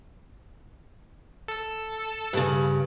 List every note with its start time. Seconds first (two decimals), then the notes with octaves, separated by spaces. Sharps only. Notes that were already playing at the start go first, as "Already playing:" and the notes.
1.48 A4 E6
2.33 G2 C#3